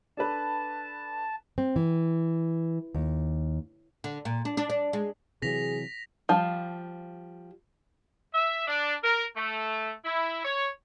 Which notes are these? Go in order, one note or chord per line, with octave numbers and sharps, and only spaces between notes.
D4 A4 B4 A5
C4
E3
D#2
D3
A#2
D4
D4
D4
G#3
C3 E3 F#3 G#4 A#6 B6 F7
F3 G3 A5
E5
D4
A#4
A3
E4
C#5